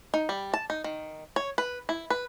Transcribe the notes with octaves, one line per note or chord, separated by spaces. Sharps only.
D#4
G3
A5
D#4
D#3
C#5
B4
E4
B4